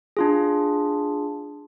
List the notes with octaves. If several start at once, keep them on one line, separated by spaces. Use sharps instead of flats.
D4 F4 G#4